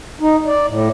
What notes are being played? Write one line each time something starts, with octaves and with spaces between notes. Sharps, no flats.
D#4
D5
A2